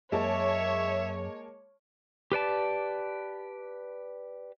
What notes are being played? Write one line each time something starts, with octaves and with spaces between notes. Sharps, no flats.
F#2 G#3 A#3 C#5 E5 A5
G4 B4 D5 A5